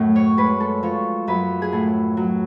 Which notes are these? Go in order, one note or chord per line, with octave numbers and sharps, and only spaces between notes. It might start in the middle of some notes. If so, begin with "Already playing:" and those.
Already playing: F#2 A2
C#5
G#3 B4
A4
F3 C#5
F#2 B4
G#4
A2 A4
F#3